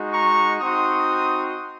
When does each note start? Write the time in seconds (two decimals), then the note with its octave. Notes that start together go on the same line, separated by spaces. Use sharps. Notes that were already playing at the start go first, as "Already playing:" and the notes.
Already playing: G#3 D#4 F#4
0.13 A#5 C#6
0.61 C4 D#4 F#4 C6 D#6